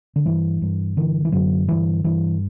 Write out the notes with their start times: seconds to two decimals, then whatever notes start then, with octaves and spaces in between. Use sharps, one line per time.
0.16 D3
0.26 G2 E3
0.62 G2
0.97 D3 E3
1.25 E3
1.32 F#2 D3 F#3
1.68 G2 E3
2.04 G2 E3